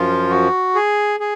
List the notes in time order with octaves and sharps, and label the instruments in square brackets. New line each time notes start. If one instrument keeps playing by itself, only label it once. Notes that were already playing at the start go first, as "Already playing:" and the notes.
Already playing: [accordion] F#2 F3 F4
F#4
G#4
G#4